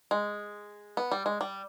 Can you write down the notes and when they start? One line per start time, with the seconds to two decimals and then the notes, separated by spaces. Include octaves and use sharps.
0.11 G#3
0.97 B3
1.12 G3
1.26 G#3
1.41 G3